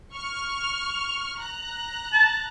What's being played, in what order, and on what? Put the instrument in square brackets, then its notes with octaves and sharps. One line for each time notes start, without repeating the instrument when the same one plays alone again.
[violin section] C#6 F6
A#5 F#6
[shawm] A5